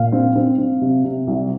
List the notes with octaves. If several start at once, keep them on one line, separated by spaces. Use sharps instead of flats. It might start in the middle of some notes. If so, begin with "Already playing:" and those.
Already playing: A#2 F5
C4
C4
C4
C3
C3
C2